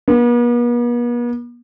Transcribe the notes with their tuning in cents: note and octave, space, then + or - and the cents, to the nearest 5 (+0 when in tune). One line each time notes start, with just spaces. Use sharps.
B3 -45